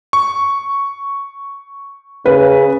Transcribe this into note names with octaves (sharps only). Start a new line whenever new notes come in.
C#6
C#3 B4